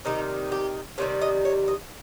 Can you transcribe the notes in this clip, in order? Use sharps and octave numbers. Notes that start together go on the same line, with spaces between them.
C3 D#3 G3 D#4
G4
C3 D#3 G3 C#5
D#5
C#5
D#5